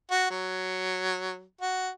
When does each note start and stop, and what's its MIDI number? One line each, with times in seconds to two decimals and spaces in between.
0.11 0.28 66
0.30 1.42 54
1.61 1.89 66